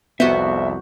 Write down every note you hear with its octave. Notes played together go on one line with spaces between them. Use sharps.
C2 F2 B3 F#4 C5 E5